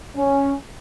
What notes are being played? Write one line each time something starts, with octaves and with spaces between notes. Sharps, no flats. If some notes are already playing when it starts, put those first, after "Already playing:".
C#4